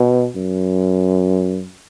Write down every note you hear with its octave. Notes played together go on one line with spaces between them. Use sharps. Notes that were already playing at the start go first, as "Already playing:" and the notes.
Already playing: B2
F#2